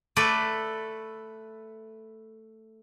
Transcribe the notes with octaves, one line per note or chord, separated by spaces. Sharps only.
A3 A4 B4 D5